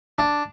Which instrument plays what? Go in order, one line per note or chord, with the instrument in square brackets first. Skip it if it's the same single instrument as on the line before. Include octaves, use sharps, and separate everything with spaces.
[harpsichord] D4